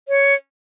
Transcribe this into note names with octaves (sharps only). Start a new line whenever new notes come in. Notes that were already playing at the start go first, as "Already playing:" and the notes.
C#5